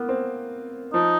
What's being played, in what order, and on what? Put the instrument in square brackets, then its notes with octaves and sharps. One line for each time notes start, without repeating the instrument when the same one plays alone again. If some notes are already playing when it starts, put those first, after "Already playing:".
Already playing: [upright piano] A#3 B3
C4
[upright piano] F3 [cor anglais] D#4